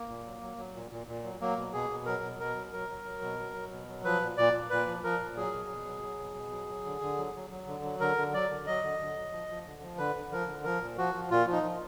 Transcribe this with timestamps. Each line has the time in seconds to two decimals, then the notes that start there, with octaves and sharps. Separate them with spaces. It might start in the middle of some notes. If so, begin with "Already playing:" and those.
Already playing: A#3
0.08 A#2
0.25 F#3
0.42 F#3
0.57 F#3
0.74 A#2
0.91 A#2
1.07 A#2
1.24 F#3
1.41 F#3 A#3
1.57 B2
1.73 B2 G#4
1.90 B2
2.06 F#3 A#4
2.22 B2
2.40 B2 A#4
2.55 F#3
2.73 F#3 A#4
2.89 F#3
3.05 F#3
3.22 B2
3.39 F#3
3.54 F#3
3.71 B2
3.88 F#3
4.04 F3 B4
4.21 A#2
4.37 A#2 D5
4.53 A#2
4.70 A#2 B4
4.86 F3
5.04 F3 A#4
5.19 A#2
5.36 F#3 G#4
5.52 B2
5.69 B2
5.85 F#3
6.02 F#3
6.19 B2
6.35 B2
6.52 F#3
6.68 F#3
6.85 D3
7.01 D3
7.18 F#3
7.35 F#3
7.50 F#3
7.67 D3
7.83 F#3
8.00 D3 A#4
8.17 D3
8.34 F#3 D5
8.49 D3
8.67 F#3 D#5
8.83 D3
8.99 D3
9.16 F#3
9.33 F3
9.48 F3
9.66 D3
9.81 F3
9.98 D3 B4
10.15 D3
10.32 F3 A#4
10.47 D3
10.64 F3 A#4
10.82 A#2
10.97 F3 F#4
11.14 F3
11.30 A#2 F4
11.46 F3
11.52 D#4
11.63 F3